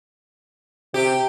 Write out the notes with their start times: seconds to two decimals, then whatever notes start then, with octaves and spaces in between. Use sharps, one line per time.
0.94 C3 G4